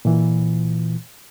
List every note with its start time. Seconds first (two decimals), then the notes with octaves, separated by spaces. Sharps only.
0.05 A#2 E3